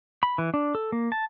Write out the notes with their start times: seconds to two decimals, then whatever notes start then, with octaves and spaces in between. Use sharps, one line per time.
0.23 B5
0.38 E3
0.54 D4
0.75 A4
0.92 A#3
1.12 A5